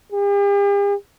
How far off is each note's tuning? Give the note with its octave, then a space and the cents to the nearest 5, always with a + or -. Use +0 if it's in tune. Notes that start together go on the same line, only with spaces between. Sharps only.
G4 +45